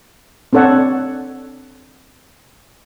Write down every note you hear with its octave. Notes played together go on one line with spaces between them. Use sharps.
C4 D4 A4 C#5 F#5